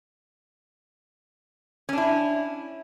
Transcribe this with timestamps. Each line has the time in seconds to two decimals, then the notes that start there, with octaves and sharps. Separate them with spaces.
1.89 C#4
1.93 D4
1.98 E4